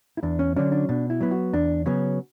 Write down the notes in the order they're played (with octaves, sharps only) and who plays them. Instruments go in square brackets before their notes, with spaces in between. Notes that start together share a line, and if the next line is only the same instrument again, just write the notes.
[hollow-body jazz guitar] E4
E2 D4
C#4
D3 F#3 C#4 D4
D4
B2 D4
E4
F#3 B3
F#4
E2 D4
C#3 F#3 B3 C#4